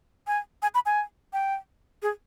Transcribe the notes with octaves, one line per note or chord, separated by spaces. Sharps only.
G#5
G#5
B5
G#5
G5
G#4